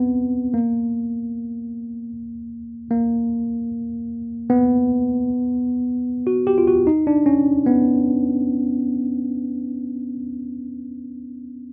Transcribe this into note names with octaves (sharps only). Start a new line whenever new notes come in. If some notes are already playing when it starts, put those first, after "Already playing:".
Already playing: B3 C4
A#3
A#3
B3
F#4
G4
F4
F#4
D#4
D4
C#4
B3